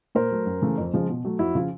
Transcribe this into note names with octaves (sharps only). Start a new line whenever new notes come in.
A#2 A#4 C5
F#3 A3
F#2
C#3 E3 A3
F2
C#3 F3 G#3
B2
F#3 A3
F2 E4 F#4
C#3 F3 F4